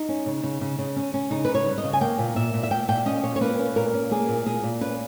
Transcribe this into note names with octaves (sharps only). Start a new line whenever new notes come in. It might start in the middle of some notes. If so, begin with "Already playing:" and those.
Already playing: D#4
C#4
C#3
C#3
C#3
C#3
C#4
C#4
C#3 D#4
C#3 B4
C#5
G3
D#5
C#3
G#5
A#3 G5
A#2
A#2 E5
A#2
E5
A#2 G5
A#2 G5
C#4 D#5
A#2 C#5
C#5
A#3 B4
C#4
A#2 A#4
C#4
A#3 G#4
A#2
A#2 G#4
A#2
C#4 B4